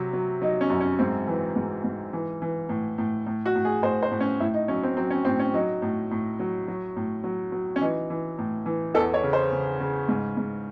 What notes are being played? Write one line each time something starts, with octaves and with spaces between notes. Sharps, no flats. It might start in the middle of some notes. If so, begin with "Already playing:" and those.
Already playing: C3 F#3
F#3
F#3 D#4
C#4
F#2
C#4
G#2 C4
E3
G#2
G#2
E3
E3
A2
A2
A2
F#4
A2
G#4
A2 C5
C5
A2
C#4
A2 E4
D#4
F#3 C#4
C4
F#3 C4
C#4
A2 C4
C#4
F#3 D#4
A2
A2
F#3
F#3
A2
F#3
F#3
C#4
E3 D#4
E3
A2
E3
E2 A4
C#5
C#3
C5
C#3
C#3
G#2
G#2